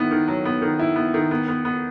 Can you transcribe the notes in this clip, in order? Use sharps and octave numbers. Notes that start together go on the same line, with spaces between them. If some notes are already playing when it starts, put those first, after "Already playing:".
Already playing: D#3 B3 E4
D#3
F#3
B3
D#3
E4
B3
D#3
B3
B3
B3